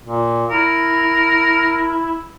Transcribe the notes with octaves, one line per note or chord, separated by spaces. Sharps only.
A#2
E4 A#4